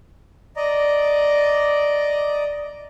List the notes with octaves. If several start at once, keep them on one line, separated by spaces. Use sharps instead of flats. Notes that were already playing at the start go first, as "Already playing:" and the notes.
D5 D#5 A#5